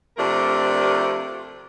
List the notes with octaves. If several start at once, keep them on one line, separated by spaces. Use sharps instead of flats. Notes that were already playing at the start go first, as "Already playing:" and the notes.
C3 F3 A3 D4 F4 A#4